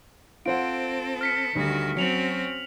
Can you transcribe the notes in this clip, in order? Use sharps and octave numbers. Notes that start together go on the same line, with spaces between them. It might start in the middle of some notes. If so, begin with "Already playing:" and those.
C4 F4 A4 C5 F#5 D7
F6 B6 C#7
D2 D#3 G3 F#4
F#3 C4 C#4 F#4 C#7 F7 F#7